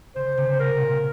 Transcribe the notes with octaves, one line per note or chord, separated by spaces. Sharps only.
C#3 C5
C#3
C5
C3 A#4
A#2